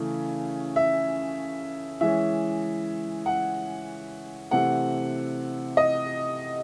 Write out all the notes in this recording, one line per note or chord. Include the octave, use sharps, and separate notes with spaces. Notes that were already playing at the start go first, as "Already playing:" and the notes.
Already playing: C#3 E3 A3
E5
E3 G#3 C#4 E5
F#5
C3 E3 A3 C4 F#5
D#5